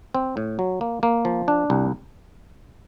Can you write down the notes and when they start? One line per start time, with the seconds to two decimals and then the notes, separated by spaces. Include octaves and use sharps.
0.15 C4
0.37 A2
0.59 F#3
0.81 A#3
1.03 A#3
1.25 F3
1.48 D4
1.70 C2